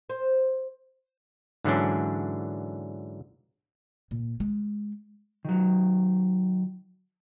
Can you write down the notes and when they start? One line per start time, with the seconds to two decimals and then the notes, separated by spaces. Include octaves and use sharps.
0.10 C5
1.64 G#2 D3 E3 F#3 C#4 D4
4.11 A#2
4.40 G#3
5.45 D#3 F#3